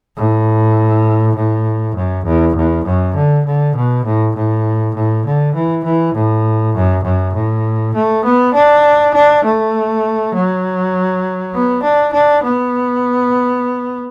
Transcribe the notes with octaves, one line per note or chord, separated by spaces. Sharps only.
A2
A2
F#2
E2
E2
F#2
D3
D3
B2
A2
A2
A2
D3
E3
E3
A2
F#2
F#2
A2
A3
B3
D4
D4
A3
F#3
B3
D4
D4
B3